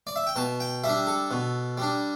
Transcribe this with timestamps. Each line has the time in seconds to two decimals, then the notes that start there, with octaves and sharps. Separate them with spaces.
0.07 D5
0.16 E5
0.27 G5
0.36 B2 A5
0.60 G5
0.84 G3 D4 E5
1.07 A4
1.31 B2
1.78 G3 D4